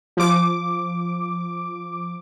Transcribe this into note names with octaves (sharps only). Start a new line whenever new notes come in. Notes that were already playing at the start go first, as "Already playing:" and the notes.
F3 D6